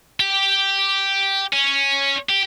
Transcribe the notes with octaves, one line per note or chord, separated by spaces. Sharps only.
G4
C#4
G4